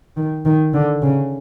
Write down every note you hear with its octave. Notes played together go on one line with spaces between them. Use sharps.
D#3
D#3
D3
C#3